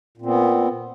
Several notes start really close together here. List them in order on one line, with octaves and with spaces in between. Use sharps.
A#2 C4 B3